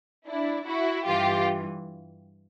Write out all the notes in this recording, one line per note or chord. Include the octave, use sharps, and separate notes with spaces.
D4 E4
E4 F#4
G2 E3 F4 G4